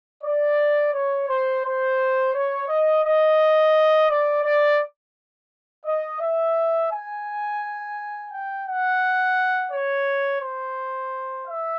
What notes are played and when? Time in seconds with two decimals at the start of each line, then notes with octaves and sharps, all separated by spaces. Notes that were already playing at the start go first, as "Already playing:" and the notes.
0.23 D5
0.93 C#5
1.28 C5
1.64 C5
2.34 C#5
2.68 D#5
3.03 D#5
4.09 D5
4.44 D5
5.85 D#5
6.20 E5
6.91 G#5
8.31 G5
8.66 F#5
9.71 C#5
10.41 C5
11.46 E5